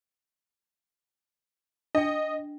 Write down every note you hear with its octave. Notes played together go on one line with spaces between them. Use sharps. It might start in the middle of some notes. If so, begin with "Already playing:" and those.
D4 D#5 G5